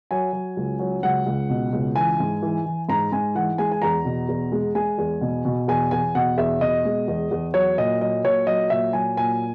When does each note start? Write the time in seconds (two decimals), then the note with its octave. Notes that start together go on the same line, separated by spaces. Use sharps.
0.11 F#3 G#5
0.33 F#3
0.57 C#2
0.79 F#3
1.03 C#2 F#5
1.26 C#2
1.50 B2
1.73 C#2
1.95 E3 G#5
2.20 G#2
2.42 E3
2.66 E3
2.89 G#2 A#5
3.12 G#2 G#5
3.35 E3 F#5
3.58 G#3 G#5
3.71 G#5
3.82 E2 A#5
4.05 B2
4.28 E2
4.52 G#3
4.75 G#3 G#5
4.98 E2
5.21 B2
5.45 B2
5.68 E2 G#5
5.91 E2 G#5
6.15 B2 F#5
6.37 E2 E5
6.61 B2 D#5
6.85 G#3
7.08 E2
7.31 E2
7.54 F#3 C#5
7.78 A#2 D#5
8.01 F#3 D#5
8.24 A#2 C#5
8.47 F#3 D#5
8.70 A#2 E5
8.93 F#3 G#5
9.17 A#2 G#5